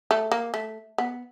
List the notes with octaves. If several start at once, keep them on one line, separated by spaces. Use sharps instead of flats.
A3
A#3
A3
B3